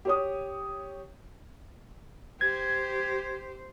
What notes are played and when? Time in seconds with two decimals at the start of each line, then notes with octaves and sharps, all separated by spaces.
0.05 G4 C#5 D#6
2.41 G4 C5 G#6